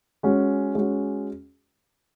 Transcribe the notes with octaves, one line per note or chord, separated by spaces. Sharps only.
G#3 C#4 F#4
G#3 C#4 F#4